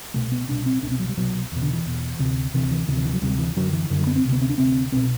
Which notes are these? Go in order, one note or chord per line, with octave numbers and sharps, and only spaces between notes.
C2 B2 A3
B3
C2 B2 D4
C4
C2 B2 D4
C4
F#3
G3
C2 B2 F#3
E2 B2
D3
E3
E2 B2
D2 C3
D2 C3 E3
E3
D2 C3 D3 E3
E3
F#3
D2 C3 G3
E3
F#2 D3 F#3
E3
F#2 D3 E3
F#3
B3
C4
D2 C3
B3
C4
D4
D2 C3 C4
C2 B2 C4